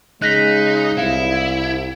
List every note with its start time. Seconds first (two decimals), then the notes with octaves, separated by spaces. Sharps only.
0.22 C#3 G#3 D#4 F#6 A#6 B6
0.98 C2 E4 F5